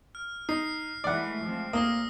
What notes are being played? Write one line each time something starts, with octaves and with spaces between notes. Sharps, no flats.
F6
D#4 C7
E3 G#3 A3 D5 F#5
F3 G#3 C4
D2 A#3 D#6 E6 A#6